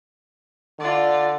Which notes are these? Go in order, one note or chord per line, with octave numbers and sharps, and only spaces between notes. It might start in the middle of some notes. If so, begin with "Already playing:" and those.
D3 F4 D5